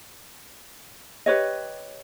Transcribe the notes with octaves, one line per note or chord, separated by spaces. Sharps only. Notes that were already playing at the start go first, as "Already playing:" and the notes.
G4 B4 C#5 D#5